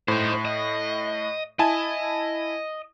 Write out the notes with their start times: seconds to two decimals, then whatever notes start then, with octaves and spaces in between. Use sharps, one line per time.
0.08 A2 D#4 C5
0.45 D#5
1.59 E4 D#5 G#5 A5